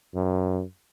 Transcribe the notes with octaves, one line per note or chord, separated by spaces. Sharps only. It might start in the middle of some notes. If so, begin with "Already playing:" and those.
F#2